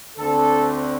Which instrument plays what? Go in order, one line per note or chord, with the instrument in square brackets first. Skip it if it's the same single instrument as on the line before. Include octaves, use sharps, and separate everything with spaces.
[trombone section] D2 D3 C4 A4